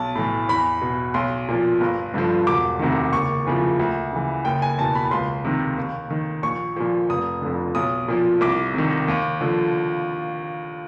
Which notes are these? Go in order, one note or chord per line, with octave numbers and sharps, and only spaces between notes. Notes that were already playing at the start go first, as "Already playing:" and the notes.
Already playing: B1 A5
A2 E3
E2 B5
B2
B1 C6
A#2 F3
G1
G2 D3 F3
E1 D6
D2 C3 D#3
F#1 C#6
E2 C#3 F3
D2
C#3 E3
F#1 G5
G#5
E2 B2 A5
B5
C#2 C6
C3 D#3
D#2
D#3
A#1 C#6
A#2 F3
F1 D#6
F2 D3
B1 D#6
A#2 F3
C2 D6
C3 D#3
D#2
D3 F3